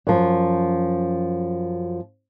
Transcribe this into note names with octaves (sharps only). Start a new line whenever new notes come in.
F#2 F3